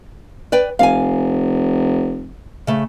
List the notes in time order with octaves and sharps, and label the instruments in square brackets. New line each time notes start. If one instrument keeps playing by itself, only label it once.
[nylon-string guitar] B4 D5 G5
[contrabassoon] F1 [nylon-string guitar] F5 G#5
[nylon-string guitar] C#3 A3